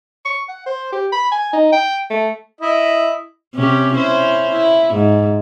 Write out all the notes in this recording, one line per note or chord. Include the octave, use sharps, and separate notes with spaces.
C#6
F#5
C5
G4
B5
G#5
D#4
G5
A3
E4 D#5
C3 C#4 G4
C#4 E4 C5
E4
G#2